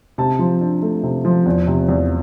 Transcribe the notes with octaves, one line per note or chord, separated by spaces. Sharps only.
C3 A5
F3
D4
A3
C3
F3
E2
C3
E2